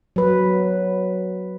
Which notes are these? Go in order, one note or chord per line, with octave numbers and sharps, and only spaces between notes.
F#3 B4